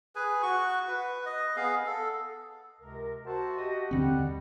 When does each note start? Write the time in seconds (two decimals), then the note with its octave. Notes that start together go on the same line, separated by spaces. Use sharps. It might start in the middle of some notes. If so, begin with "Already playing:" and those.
0.15 G#4 B4 G#5
0.43 F#4 C#6
0.88 B4
1.26 D#5
1.56 B3 G#4 F5
1.86 A4
2.80 C#2 C3 A#4
3.26 F#4 C5 E5 A5
3.57 G4 D#5
3.91 D#2 D3 G3 C4 F#5